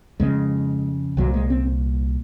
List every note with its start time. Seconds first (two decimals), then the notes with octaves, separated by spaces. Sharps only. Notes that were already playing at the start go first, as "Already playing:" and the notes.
0.20 F2 C#3 G#3
1.17 C2 A#2 F#3
1.34 G#3
1.50 C4